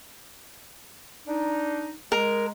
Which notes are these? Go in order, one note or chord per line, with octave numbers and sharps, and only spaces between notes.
D4 D#4
G#3 A#4